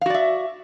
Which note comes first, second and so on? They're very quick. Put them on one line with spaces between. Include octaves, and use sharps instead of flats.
F5 F#4 D5 E5